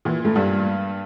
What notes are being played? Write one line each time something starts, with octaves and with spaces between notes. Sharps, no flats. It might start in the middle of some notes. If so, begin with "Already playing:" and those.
A#2 E3
A2 A3
G2 G3